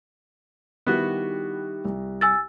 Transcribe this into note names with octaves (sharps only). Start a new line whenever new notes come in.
D#3 G3 B3 E4 F#4
C2
G#5 E6 A6